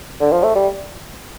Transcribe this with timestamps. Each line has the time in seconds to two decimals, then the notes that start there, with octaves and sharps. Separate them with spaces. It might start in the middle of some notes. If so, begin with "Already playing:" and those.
0.21 D3
0.32 F3
0.43 A3
0.56 G3